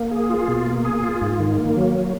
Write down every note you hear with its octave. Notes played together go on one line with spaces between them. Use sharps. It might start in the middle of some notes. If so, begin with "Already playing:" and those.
Already playing: A#3
G#4
F4
B2
A#3
G#4
F4
G#2
D#3
A#3
F#3